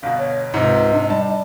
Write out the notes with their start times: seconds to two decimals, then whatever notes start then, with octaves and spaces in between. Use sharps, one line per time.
0.03 G1 B2 F5
0.18 C#5
0.54 C#2 G#2 C3 D#5
0.93 D4
1.10 G3 A5